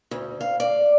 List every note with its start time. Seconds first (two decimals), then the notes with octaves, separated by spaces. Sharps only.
0.11 D2
0.41 F5
0.60 D5